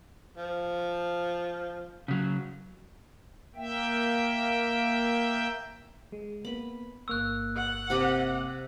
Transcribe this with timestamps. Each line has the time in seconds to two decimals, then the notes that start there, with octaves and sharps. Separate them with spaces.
0.37 F3
2.08 C#3 F#3
3.56 A#3 E5 G5
6.12 G#3
6.45 A#3 B3 B5
7.08 G1 A#3 C#6 E6 F#6
7.57 F#5
7.90 C3 G4 D#5